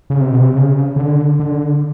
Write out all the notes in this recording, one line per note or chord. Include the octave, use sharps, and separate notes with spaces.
C#3
C3
B2
C3
C#3
D3
D3